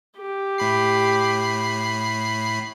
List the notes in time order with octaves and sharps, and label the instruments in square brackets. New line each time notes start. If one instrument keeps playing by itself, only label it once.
[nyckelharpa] G4
[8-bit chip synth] A2 B5 C7